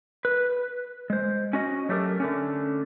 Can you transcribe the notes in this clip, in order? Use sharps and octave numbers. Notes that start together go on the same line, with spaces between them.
B4
G#3 C5
C#4 F#4 D#5
F#3 A3 G4 A4 A#4
D3 A3 C#4